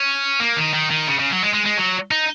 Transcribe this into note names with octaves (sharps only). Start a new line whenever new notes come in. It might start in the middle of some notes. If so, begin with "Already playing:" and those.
Already playing: C#4
A#3
D#3
D#3
D#3
C#3
C#3
F#3
G#3
G#3
G#3
F#3
D#4